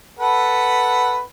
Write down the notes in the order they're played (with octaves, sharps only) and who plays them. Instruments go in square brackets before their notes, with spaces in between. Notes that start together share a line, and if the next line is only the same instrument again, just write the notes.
[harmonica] A4 B4 F#5